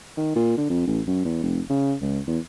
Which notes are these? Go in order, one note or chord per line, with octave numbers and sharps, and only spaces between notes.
D#3
A#2
D3
F2
A1
F#2
E2
F1
C#3
C#2
E2